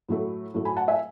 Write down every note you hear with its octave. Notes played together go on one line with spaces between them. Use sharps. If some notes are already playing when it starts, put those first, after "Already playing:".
A2 F#3 A3
A2 F#3 A3
G#5 B5
F#5 A5
E5 G#5